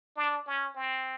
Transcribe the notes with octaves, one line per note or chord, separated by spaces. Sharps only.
D4
C#4
C4